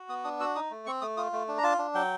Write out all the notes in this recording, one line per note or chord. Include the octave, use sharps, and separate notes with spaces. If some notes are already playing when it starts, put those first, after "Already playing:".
Already playing: F#4
B3 D#6
D4 D#6
F#4 E6
D#4 D#6
A3
C4 C#6
A3 D#6
F4 D#6
A3
D4
A#5
F4 A5
D4
F#3 G5